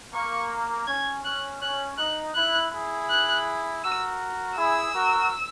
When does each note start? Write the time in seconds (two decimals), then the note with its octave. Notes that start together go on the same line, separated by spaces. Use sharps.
0.13 A#3 C#6
0.87 C#4 G#6
1.24 C#4 F#6
1.61 C#4 F#6
1.98 D#4 F#6
2.35 E4 F#6
2.72 E4 G#4
3.10 F#6
3.83 F#4 A#4 E6
4.57 E4 G#4 E6
4.94 F#4 A#4